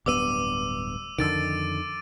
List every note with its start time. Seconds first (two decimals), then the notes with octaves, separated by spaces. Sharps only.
0.06 D1 G2 B3 D6 E6 D#7
1.18 F2 D3 D#3 E6 A6 D7